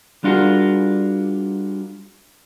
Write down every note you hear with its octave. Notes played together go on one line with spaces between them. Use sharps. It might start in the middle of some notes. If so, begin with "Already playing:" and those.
G3 D4 F4 F#4 G#4 A#4